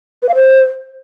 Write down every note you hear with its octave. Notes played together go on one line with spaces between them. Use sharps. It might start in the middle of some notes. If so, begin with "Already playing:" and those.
B4
F5
C5